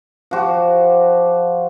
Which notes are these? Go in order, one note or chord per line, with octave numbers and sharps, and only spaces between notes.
F3 F#4 G4